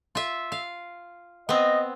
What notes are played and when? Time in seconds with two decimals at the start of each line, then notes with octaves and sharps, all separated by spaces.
0.15 F4 E5
0.52 F5
1.49 B3 C4 D#5